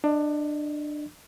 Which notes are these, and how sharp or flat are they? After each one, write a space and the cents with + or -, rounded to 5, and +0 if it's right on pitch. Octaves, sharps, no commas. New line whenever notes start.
D4 +20 D#5 +0